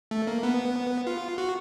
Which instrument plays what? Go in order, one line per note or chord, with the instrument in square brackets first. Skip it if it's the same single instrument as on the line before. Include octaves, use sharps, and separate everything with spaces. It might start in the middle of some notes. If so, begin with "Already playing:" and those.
[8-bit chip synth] A3
A#3
B3
F4
F#4